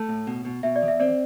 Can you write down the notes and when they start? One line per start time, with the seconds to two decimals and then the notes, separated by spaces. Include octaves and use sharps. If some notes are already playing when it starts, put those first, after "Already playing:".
Already playing: A3 A5
0.09 A2
0.27 B2
0.45 B2
0.63 B2 E5
0.76 D5
0.82 E2
0.88 E5
1.00 C4 D5